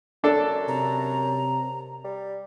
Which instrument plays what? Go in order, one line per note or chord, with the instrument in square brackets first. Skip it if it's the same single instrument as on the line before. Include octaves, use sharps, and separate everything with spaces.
[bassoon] F#2 [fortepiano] D4 A4
[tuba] C3 [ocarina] A#5
[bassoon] G3